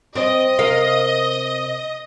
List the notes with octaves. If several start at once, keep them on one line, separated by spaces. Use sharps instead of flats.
C4 D#5
C3 A#4 F5